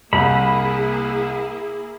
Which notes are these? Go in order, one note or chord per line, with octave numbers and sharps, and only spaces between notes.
C2 A#3 E4 G#4 B5